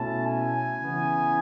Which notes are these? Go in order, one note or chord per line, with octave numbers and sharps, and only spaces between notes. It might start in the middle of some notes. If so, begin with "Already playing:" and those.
Already playing: B2 A3 C#4 E4 A5
G#5
C#3 E3 B3